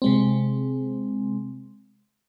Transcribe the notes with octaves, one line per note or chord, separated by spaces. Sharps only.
C3 G#3 C4